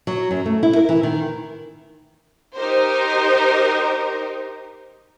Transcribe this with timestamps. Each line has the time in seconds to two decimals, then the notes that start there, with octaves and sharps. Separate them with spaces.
0.07 F#3
0.31 F#2
0.46 A3
0.63 E4
0.76 A#4
0.89 E3
1.03 D#3
2.56 D#4 G4 A#4 C5